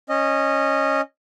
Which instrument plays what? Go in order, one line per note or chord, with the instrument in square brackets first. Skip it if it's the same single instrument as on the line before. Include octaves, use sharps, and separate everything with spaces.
[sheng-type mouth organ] C#4 D#5